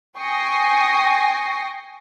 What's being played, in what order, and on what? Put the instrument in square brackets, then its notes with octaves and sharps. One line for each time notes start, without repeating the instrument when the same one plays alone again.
[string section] G5 G#5 C#6 D#6 A#6 C7